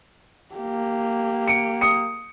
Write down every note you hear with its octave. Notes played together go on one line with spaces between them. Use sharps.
A#3 G4
C#7 D7
D#6 C#7